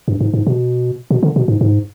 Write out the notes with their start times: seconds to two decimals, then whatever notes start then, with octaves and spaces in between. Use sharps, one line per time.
0.08 G2
0.21 G#2
0.34 G#2
0.47 B2
1.11 B2
1.23 D3
1.36 B2
1.48 G#2
1.61 G#2